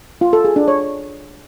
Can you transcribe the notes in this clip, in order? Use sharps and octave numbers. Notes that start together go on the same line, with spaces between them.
F4
A4
G#4
D4
C#5